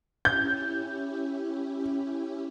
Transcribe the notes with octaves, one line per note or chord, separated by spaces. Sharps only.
C#4 E4 G4 G6